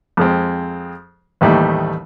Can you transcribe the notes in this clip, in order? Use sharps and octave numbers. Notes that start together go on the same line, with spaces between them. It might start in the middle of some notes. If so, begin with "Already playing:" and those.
F2 G#3 C4
A1 D#2 G3 A3 D#4